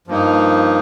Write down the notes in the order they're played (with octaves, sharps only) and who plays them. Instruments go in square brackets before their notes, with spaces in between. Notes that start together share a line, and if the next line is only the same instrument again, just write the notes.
[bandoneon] G2 F3 A#3 D#4